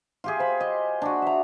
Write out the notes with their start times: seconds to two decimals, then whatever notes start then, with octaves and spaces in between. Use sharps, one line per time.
0.24 F4 G4 G#4
0.39 C5 B5
0.60 D#5
1.02 D4 F#4
1.22 E5 A#5